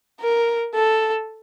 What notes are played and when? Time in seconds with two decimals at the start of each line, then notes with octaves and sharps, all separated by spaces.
0.21 A#4
0.74 A4